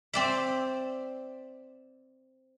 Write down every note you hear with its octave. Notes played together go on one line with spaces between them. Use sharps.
C4 D5 E5